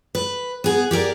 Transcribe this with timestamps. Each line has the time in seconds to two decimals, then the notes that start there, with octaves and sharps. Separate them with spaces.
0.15 B4
0.64 B3 G#4
0.91 G4 G#4 A#4 D5